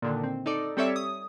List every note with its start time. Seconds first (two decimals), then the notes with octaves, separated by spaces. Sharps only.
0.02 A#2 D3 D#3
0.23 C4
0.46 D#4 A4 D5
0.77 G3 C4 A4 C#5 D5 E5
0.96 D#6